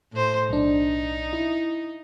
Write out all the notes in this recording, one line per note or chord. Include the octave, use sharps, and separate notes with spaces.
A2 C5
B1 D4 D#4
E4